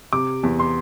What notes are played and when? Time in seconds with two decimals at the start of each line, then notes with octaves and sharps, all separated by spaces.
0.13 C3 D6
0.43 E2
0.59 C6